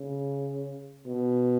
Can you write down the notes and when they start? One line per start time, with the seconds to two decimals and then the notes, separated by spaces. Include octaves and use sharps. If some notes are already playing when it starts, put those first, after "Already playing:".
Already playing: C#3
1.07 B2